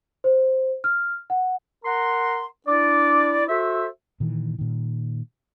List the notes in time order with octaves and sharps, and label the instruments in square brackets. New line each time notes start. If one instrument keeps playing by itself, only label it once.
[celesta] C5
F6
F#5
[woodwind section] A#4 F#5 A#5 C6
D4 E4 D5
F#4 A4 C5 E5
[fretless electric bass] A#2 D#3 E3
A#2 D#3